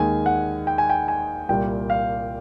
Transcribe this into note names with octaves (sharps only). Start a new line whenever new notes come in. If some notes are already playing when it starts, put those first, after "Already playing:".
Already playing: D#2 D#3 G#3 G#5
F#5
G5
G#5
G5
G#5
C2 A#2 G3 A#3 G5
F5